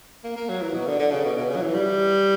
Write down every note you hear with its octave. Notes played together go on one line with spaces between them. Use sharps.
A#3
A#3
F#3
E3
B2
D3
D3
C#3
B2
B2
C#3
F#3
E3
G3